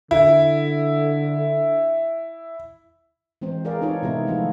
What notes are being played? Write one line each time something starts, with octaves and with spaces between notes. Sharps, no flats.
D3 E4
E3 G#3 C4 C5
G#4 A#4 D5 F5
C4 D#4 F4 A4 C#5
C3 G#3 B3 E4 A#4
D#3 F3 A3 F4 A4